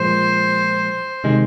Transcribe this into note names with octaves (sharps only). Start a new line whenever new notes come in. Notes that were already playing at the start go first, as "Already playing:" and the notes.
Already playing: A#2 F3 G#3 C5
C3 D#3 G#3